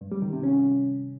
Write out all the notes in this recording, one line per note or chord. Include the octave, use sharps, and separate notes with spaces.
G2
G3
D#3
C3
C#4